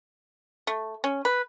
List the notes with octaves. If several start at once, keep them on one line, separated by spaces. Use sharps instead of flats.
A3
C#4
B4